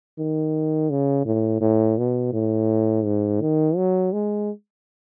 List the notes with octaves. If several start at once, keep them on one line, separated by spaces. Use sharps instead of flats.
D#3
C#3
A2
A2
B2
A2
G#2
D#3
F#3
G#3